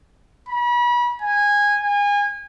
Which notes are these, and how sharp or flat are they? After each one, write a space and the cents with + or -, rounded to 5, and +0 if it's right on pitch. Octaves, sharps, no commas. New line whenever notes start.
B5 -35
G#5 -15
G#5 -30